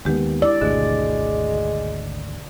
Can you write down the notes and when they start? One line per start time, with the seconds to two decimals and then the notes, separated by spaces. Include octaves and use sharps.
0.05 D#2 D#3 G#3 B3 G4
0.42 E4 D5 D6
0.62 G#1 D2 B2 D3 G#3